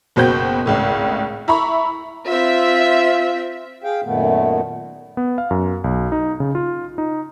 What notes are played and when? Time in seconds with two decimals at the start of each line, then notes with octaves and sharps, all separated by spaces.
0.16 F#1 B2 F#4 C5 G5 G6
0.66 G#1 C#2 A2
1.48 E4 A#5 B5 C#6
2.28 C4 F4 E5
3.84 G#4 F5 G5
4.04 F#2 A#2 D#3 A3 B3
5.17 B3
5.38 F5
5.51 F#2
5.84 B1
6.12 D#4
6.40 C#3
6.55 F4
6.98 D#4